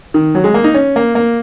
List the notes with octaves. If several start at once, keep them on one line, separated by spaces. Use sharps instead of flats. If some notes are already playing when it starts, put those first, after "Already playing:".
D#3
F#3
G#3
A#3
D#4
C#4
A#3
A#3